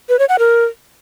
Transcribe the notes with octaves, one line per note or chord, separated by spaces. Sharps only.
B4
C#5
F#5
A#4